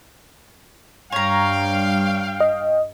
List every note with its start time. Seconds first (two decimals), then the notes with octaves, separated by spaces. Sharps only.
1.12 G2 C#5 F5 G5 A#5
2.40 D#5